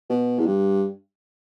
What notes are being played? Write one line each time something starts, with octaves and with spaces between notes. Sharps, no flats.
B2
E2
G2